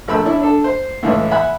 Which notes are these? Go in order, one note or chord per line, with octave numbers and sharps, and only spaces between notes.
A#1 A3 B5 E6
C#4 D4 E4
D4 A4
C5
C#2 A2 E3 E4 C#5
E5 F#5 G#5 B5 F#6